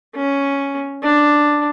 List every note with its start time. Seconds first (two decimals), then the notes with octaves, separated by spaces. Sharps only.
0.16 C#4
1.03 D4